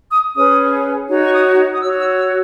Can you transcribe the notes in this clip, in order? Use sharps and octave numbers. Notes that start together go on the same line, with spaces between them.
D#6
C#4 G#4 B4 D#6
D#4 F#4 C#5
C#6
D#6
D#6
F#4 C#5 E6
E6
E6